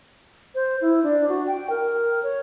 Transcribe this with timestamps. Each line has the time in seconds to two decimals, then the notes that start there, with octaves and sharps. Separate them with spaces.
0.55 C5
0.81 E4
1.03 D4
1.29 F#4
1.47 G5
1.70 A#4
2.23 C#5